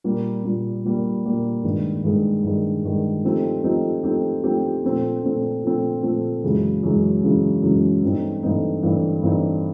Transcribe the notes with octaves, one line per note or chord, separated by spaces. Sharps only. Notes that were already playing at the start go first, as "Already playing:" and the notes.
A#2 G3 A#3
A#2 G3 A#3
A#2 G3 A#3
A#2 G3 A#3
G2 D#3 G#3
G2 D#3 G#3
G2 D#3 G#3
G2 D#3 G#3
F3 A3 C4 D#4 G4
F3 A3 C4 D#4 G4
F3 A3 C4 D#4 G4
F3 A3 C4 D#4 G4
A#2 F3 A3 C4
A#2 F3 A3 C4
A#2 F3 A3 C4
A#2 F3 A3 C4
F#2 C#3 E3 G#3
F#2 C#3 E3 G#3
F#2 C#3 E3 G#3
F#2 C#3 E3 G#3
G2 E3 A3 C4 D#4
G2 E3 A3 C4 D#4
G2 E3 A3 C4 D#4
G2 E3 A3 C4 D#4